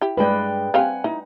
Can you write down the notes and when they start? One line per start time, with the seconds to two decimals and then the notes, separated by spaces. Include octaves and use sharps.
0.01 E4 G4
0.17 G2 G#3 B4 D5 G5
0.74 C4 G4 F5 F#5 G#5
1.04 D#4 E4